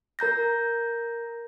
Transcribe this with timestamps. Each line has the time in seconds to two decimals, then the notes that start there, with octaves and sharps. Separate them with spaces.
0.19 A#4 A#5 G6 A#6